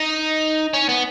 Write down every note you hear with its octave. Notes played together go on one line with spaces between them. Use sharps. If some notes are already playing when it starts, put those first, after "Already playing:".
Already playing: D#4
C#4
B3